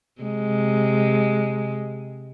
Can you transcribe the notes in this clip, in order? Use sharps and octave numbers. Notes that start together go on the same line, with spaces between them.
C3 G#3